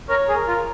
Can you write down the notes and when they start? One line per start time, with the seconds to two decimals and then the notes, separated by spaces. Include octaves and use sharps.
0.09 A#4 C#5
0.29 G#4
0.34 A#4
0.47 F4